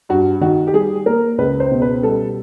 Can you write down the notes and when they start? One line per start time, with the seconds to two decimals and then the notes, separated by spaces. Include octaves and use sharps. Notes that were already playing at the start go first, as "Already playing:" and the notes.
0.09 G2 F#4
0.41 D#3 F#4
0.67 G4
0.74 G3 G#4
1.06 A#3 A#4
1.38 C#2 B4
1.60 C5
1.71 B2
1.82 B4
2.03 G3 A4